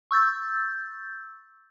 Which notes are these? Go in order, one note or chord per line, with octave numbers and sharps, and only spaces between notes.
C#6 E6 G6 A6